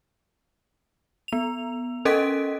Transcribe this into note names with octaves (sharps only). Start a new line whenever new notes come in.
B3 F7
C#4 A4 A#4 D#5 B6 D7